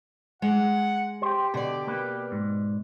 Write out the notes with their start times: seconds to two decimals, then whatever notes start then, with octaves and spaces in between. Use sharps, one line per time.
0.42 G#3 F#5
1.22 G4 C5 G5
1.54 B2 D3 D5
1.87 A#3 B4
2.32 G#2